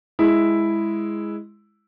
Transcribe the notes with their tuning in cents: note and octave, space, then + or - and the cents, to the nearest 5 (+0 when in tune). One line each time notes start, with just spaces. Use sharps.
G#3 +0 E4 +0